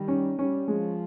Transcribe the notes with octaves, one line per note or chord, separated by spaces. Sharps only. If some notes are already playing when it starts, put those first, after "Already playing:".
Already playing: D#3 G3
C#4
G3 C#4
F3 G#3